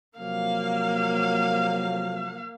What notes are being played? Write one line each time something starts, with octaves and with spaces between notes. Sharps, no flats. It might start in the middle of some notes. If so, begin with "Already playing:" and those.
C3 F3 F#3 A#3 F5